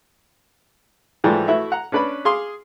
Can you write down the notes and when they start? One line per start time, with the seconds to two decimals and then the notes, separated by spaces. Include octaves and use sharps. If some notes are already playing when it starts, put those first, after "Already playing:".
1.24 G#2 E3 F3 G3 A3
1.48 A3 E4 F#4 B4 E5
1.72 F#5 A#5
1.92 C#4 D4 B4 D5 B5
2.25 G#4 F5 C6 D6